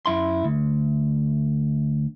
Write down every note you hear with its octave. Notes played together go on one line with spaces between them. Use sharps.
F#2 E4 C6
D2